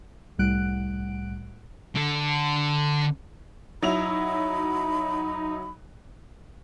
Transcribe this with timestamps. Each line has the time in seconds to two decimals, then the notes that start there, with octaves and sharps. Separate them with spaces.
0.38 C2 A2 G3 F#5 F#6 D7
1.96 D3 A4
3.82 F#3 D#4 E4 B5 F7